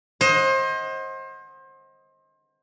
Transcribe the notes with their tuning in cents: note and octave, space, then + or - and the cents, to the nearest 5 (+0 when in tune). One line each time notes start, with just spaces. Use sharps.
C5 +30 D#5 +20 F#5 +0